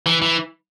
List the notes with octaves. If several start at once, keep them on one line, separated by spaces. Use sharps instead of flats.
E3
E3